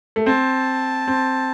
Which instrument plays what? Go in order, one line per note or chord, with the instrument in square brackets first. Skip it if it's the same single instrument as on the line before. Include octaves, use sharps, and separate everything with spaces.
[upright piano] A3
[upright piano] C4 [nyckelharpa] A5
[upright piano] C4